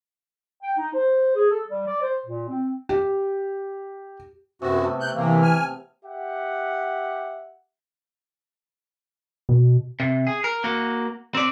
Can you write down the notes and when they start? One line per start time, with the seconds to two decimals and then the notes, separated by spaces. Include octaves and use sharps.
0.63 G5
0.78 D#4
0.94 C5
1.36 G#4
1.50 A4
1.68 G3
1.87 D5
2.02 C5
2.26 A#2
2.49 C4
2.89 G4
4.62 F#2 C3 B3 F#4
4.84 A3
5.00 C3 F#6 G6
5.15 C3 E3 A#3
5.42 G#5 F6
6.06 G4 E5 F#5
9.49 B2
10.00 C3
10.27 G#4
10.44 A#4
10.64 A#3 F#4
11.35 C4 D5